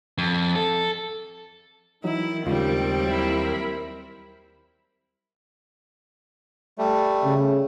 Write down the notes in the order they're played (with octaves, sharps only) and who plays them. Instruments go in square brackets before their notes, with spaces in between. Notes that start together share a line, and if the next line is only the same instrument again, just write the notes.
[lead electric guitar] F2
A4
[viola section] D#3 [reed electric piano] E3 F#3 D#4 [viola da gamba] E4
[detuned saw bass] D#2 [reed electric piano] C#3 G#3 F4 [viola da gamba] G3 C4
[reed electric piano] F#3 [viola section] E4 A#4 B5
[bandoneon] G3 A3
[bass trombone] C#3